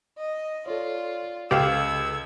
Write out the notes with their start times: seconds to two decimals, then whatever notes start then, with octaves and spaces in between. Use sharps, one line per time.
0.18 D#5
0.66 F4 A4 C#5 D5
1.51 C#2 C#3 G4 A4 F5 E6 G#6 E7